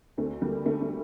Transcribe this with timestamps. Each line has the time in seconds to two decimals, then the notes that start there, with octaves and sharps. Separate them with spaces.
0.18 D2 A3 C4
0.41 D3 G3 A#3
0.65 D3 A3
0.81 A3